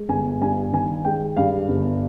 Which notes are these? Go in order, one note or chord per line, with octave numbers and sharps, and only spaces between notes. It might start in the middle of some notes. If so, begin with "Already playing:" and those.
Already playing: G#3
G1 G#5
G2 G#5
D#3 G#5
G#3 G5
G2 F5
G1